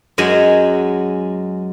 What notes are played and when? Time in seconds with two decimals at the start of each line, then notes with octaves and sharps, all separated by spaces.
0.18 F#2 F#3 G#3 C#4 G#5